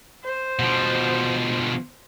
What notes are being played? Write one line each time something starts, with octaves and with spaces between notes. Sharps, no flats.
C5
B2 F3